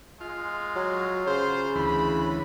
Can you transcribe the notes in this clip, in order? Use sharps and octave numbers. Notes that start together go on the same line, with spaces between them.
G#3 F4
F#3
C#3 C5
D2 E3 B5